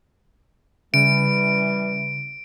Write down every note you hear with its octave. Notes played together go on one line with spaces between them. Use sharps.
C#3 E3 G3 D7